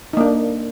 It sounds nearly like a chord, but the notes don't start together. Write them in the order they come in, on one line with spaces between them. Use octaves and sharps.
D#4 A#3 D4